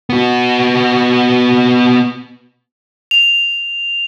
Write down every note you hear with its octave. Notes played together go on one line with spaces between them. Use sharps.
B3 F#4
F7